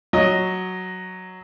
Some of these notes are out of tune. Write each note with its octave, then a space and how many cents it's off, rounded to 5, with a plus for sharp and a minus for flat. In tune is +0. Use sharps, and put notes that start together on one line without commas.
F#3 +0 D#5 +0